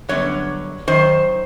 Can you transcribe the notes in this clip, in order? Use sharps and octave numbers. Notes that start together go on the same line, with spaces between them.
F#2 D3 G3 B3 C#5
F#2 D#3 C5